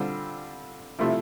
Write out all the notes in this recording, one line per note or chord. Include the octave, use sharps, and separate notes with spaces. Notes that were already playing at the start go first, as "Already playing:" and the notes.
Already playing: D3 G3 C4 F4
C3 F3 A3 E4